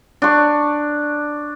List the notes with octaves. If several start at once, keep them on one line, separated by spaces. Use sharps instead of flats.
D4 C#6